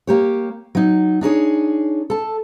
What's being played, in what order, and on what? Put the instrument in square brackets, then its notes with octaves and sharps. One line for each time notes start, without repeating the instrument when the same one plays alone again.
[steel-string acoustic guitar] A#3 G4 C#5
F#3 D#4
D4 D#4 G#4 C#5
A4 A5